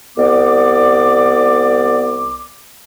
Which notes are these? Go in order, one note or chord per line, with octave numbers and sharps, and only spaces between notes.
C2 B3 D5 D6